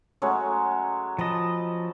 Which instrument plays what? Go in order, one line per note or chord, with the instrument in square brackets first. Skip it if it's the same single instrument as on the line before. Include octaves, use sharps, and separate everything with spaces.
[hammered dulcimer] F#3 G#3 A3 [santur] C#4 C#5 F#5
[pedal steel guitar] F3 D#5 [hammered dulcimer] A5 B5